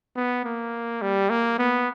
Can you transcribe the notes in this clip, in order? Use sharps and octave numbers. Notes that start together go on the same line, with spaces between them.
B3
A#3
G3
A#3
B3